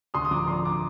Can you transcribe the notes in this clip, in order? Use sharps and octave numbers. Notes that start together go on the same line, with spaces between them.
D2 C6 D#6
D#6
F3 A#5 D6
D3 C6 D#6
A#5 D6